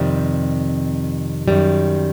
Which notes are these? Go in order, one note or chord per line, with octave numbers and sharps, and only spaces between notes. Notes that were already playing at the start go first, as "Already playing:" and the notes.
Already playing: F2 C3 D#3 G3
F#2 D#3 G3